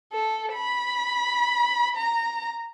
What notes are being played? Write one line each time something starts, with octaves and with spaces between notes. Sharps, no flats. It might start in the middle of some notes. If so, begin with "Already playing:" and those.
A4
B5
A#5